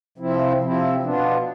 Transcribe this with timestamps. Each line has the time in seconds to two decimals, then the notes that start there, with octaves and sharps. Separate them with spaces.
0.18 C3 F3 C4 E4
0.61 C3 F3 C4 E4
1.04 B2 B3 D4 F4